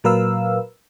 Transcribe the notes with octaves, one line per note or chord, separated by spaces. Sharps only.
A#2 F#3 A#4 B4 F5 E6